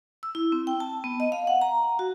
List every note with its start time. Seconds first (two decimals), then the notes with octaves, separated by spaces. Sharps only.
0.23 E6
0.35 E4
0.52 C4
0.67 G5
0.80 A5
1.04 B3
1.20 D#5
1.32 F5
1.47 F#5
1.61 A#5
1.99 F#4